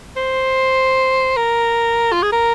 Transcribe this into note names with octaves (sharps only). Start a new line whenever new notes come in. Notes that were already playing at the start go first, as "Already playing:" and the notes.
C5
A#4
F4
G#4
A#4